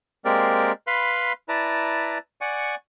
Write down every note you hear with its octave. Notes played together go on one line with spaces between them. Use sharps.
G#3 A#3 C4 G4 A#4 D5
B4 F5 B5 C6
E4 B4 D5 A5 A#5
D5 F#5 G#5 C#6